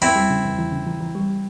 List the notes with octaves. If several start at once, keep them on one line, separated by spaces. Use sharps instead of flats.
E2 C4 E4
G3
C#3
E2
E3
C#3
E3
E3
G3